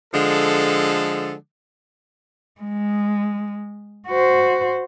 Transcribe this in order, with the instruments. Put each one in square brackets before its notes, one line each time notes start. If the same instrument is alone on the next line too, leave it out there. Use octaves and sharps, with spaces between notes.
[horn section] D3 F3 G#3 A4
[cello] G#3
F#4 C5